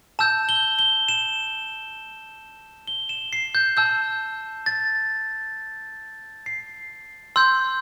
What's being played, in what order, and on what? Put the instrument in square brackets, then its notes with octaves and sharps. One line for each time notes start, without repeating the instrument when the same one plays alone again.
[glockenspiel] A5 E6 G6 E7
G7
G7
E7
G7
E7
C7
G6
A5 E6 G6
A6
C7
C6 E6 G6